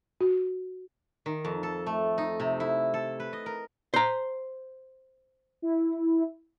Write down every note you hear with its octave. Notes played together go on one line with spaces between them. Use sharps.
F#4
D#3
F2
A4
A3
D#4
C3
E4
A4
B4
D#5
A#4
C5 A#5
E4